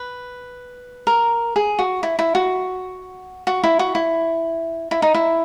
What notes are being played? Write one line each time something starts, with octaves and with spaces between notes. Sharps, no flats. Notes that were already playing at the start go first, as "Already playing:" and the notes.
Already playing: B4
A#4
G#4
F#4
E4
E4
F#4
F#4
E4
F#4
E4
E4
D#4
E4